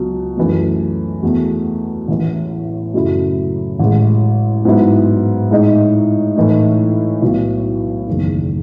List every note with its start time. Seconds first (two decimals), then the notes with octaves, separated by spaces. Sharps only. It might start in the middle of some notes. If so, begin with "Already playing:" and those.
Already playing: C#2 B2 F#3
0.37 F#2 E3 A3
1.23 E2 B2 A3
2.08 A1 A2 E3
2.94 F#2 C#3 F#3 A3 E4
3.79 A1 A2 G#3
4.65 G#2 F#3 B3 E4
5.51 A2 G#3 D#4
6.36 A2 E3 A3 D#4
7.21 B1 A2 F#3 B3 E4
8.07 F#1 E2 D#3